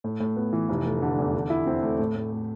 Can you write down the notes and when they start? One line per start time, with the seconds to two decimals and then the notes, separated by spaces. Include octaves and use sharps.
0.04 A2
0.20 A2
0.36 B3
0.53 E3
0.69 F1
0.85 A3
1.02 D3
1.18 E2
1.34 D3
1.50 E4
1.67 C4
1.82 A3
1.99 A2
2.16 A2
2.32 A3